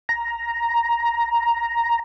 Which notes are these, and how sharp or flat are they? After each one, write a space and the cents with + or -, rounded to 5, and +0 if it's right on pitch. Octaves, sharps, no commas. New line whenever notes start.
A#5 +5